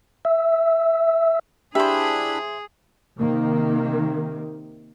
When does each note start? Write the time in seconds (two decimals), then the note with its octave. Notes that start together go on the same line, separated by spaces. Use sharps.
0.25 E5
1.75 D4 E4 G4 G#4 C5 E5 B5
3.19 C3 D#3 A#3